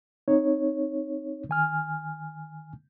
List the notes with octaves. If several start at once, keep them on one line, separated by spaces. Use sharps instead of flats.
C4 D#4 C#5
D#3 G#5 F6